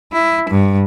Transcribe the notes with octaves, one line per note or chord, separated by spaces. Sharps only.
E4
G2